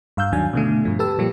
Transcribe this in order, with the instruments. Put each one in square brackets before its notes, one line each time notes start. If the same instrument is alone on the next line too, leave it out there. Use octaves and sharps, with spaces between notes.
[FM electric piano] G2 F5 E6 G6
D#2 D#3 F#3 D4 G#5
B2 D3 A3
G2 F3
G4 A4 B4 A5 E6
A#2 F3 G3 A#3 G4